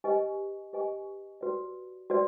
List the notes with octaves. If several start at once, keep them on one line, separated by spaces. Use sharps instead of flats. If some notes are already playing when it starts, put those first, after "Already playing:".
G4 B4 D#5 G#5 C#6
G4 B4 D#5 G#5 C#6
F#4 B4 D5
F#4 B4 D5